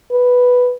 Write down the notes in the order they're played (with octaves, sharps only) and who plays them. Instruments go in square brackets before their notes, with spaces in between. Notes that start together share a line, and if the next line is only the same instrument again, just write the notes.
[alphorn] B4